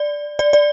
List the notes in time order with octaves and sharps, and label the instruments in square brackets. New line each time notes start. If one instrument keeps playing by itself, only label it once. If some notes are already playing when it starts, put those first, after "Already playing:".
Already playing: [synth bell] D5
D5
D5